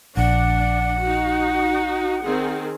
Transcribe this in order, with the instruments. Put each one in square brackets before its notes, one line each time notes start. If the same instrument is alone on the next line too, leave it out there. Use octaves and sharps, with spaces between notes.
[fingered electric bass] A#1 [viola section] D4 [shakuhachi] F#5
[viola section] D#4 F#4
D#3 C4 G#4